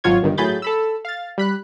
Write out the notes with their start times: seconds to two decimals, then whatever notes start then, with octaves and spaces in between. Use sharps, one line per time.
0.04 G#1 G#2 F#3 F4 C#5 G#6
0.22 G1 G2 D#3
0.38 A2 F#3 G#4 B5 G6 A6
0.62 A4 B5 E6
1.05 F5 A6
1.38 G3 B5 F#6